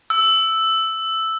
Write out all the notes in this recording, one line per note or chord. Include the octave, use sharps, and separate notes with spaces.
E6